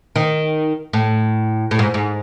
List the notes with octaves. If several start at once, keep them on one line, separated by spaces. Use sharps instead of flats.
D#3
A2
A2
G#2
G#2